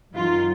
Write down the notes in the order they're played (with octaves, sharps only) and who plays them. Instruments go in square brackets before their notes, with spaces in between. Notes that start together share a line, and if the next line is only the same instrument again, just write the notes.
[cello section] F#2 D#3 F#3 F4